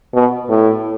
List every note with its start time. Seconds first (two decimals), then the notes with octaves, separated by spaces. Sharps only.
0.15 B2
0.49 A2